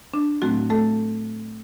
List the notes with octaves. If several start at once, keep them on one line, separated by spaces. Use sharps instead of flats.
D4
A2 F#3 A3 C4 F#4
A3 A4